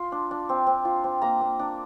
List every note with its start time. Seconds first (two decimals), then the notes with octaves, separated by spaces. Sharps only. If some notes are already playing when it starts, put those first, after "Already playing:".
Already playing: F4 C6
0.12 D4
0.31 D4
0.49 C4
0.67 C4
0.85 F4
1.04 C4
1.22 A#3 A#5
1.41 A#3
1.59 D4